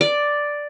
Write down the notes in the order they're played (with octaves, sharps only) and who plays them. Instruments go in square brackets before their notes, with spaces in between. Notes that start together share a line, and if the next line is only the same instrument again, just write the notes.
[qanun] D5